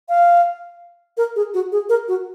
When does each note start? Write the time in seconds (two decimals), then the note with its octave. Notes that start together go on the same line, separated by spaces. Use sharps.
0.09 F5
1.17 A#4
1.36 G#4
1.54 F#4
1.72 G#4
1.89 A#4
2.08 F#4